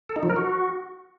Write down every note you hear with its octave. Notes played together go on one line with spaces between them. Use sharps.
A4
D#4
F3
A#4
F#4